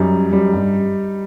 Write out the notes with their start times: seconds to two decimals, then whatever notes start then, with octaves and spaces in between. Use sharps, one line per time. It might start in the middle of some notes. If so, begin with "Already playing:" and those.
Already playing: F#2 G3 D#4
0.32 F#2 G3
0.53 G2